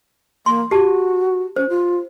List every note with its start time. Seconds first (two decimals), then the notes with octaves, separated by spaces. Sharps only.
0.46 A#3 C6
0.71 F#4 G4 A5
1.56 C#4 C5
1.69 F4